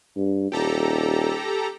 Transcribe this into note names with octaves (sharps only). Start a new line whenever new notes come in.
G2
D#1 G4 A4 A#5